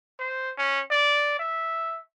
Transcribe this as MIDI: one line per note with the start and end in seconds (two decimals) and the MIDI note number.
0.20 0.51 72
0.58 0.81 61
0.91 1.37 74
1.39 2.00 76